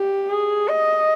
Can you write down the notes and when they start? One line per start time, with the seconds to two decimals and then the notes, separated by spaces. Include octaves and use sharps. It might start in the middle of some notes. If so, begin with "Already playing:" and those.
Already playing: G4
0.30 G#4
0.69 D#5